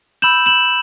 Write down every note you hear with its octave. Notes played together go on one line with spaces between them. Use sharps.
B5 E6 G6 E7 F#7
E7 F#7